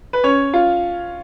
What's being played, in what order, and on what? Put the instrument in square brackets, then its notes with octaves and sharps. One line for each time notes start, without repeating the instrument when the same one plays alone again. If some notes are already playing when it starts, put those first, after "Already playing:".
[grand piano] B4
[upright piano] C#4 [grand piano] C#5
[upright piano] F4